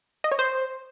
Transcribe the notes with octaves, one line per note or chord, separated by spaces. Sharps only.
D#5
C#5
C5